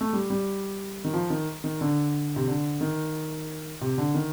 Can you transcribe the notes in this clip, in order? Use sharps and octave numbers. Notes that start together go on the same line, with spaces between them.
A3
G3
G3
D#3
F3
D#3
D#3
D3
C3
D3
D#3
C3
D3
D#3